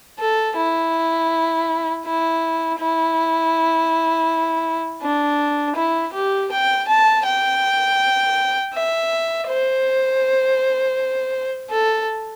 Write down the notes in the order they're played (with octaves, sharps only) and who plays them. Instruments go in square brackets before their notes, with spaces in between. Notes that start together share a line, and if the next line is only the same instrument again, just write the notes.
[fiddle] A4
E4
E4
E4
D4
E4
G4
G5
A5
G5
E5
C5
A4